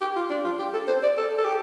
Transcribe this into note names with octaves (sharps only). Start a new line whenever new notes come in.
G4
F4
D4
F4
G4
A4
C5
D5
A4
A4
G4